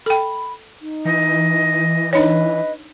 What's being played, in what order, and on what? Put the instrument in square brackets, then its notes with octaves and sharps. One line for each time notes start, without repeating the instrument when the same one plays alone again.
[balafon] A4 G5 [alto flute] B5
[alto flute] D#4
[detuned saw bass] E3 [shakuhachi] D#5
[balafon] D4 D#4 C#5 [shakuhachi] B4 [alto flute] D#5